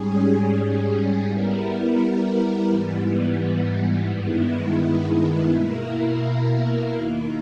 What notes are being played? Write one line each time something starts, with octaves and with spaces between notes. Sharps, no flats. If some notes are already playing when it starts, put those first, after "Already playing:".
Already playing: G#2 G3 C#4 G#4
G3 B3 E4 A#4
G#2 E3 G3 B3
G2 D#3 G#3 B3 E4
B2 A#3 E4 A#4
D#2 D#3 A#3